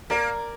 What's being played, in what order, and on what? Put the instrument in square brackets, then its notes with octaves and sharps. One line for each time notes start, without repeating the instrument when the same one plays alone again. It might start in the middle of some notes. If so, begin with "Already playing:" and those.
[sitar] A#3 [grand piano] A#4 D5